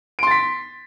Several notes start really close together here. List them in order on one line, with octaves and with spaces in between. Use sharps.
D7 C6 A6 B6